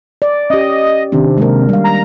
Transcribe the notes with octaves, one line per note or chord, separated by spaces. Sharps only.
D5
C#4 G4 D#5
C3 D#3 D4
G#3 A#3 A#4
G3 F5
A#5